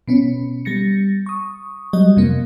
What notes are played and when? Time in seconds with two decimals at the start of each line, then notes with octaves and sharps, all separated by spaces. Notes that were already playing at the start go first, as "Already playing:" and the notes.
0.08 B2 B3 C#4
0.65 G3 A6 A#6 C#7
1.26 C#6 D#6
1.93 F#3 G3 D#5
2.17 F2 C3 A#3